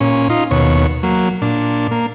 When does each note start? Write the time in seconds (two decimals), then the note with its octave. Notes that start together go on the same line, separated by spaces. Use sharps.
0.01 A#2 C#4
0.30 D#4 F4
0.51 D#2 B2 C#5
1.03 F#3 A#3
1.42 A#2 D4
1.91 A#3